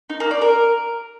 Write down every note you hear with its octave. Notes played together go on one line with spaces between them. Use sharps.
D#4
A#3
D5
A#4